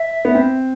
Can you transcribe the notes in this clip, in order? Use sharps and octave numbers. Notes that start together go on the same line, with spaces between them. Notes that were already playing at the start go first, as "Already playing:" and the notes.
Already playing: E5
B3
C4